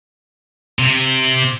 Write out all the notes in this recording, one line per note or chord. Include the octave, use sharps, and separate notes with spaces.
C3